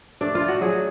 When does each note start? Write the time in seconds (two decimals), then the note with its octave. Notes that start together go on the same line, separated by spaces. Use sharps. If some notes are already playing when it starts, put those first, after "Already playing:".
0.21 A3 D4
0.35 F4
0.41 A3
0.48 F#4
0.61 F#3 G#4